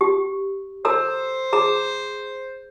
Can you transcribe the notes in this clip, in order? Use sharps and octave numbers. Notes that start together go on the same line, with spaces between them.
G4
A4 C5 A#5 E6
G#4 A#5